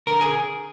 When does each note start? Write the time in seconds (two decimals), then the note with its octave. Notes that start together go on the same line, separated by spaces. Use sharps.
0.07 D3 A#4
0.21 G#4